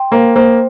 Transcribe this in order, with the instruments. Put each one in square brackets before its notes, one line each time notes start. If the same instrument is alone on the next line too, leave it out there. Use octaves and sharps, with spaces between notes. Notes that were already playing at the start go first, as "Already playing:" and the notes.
Already playing: [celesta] G5 C6
[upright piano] A#3 [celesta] C5
[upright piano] A#3 [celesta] C5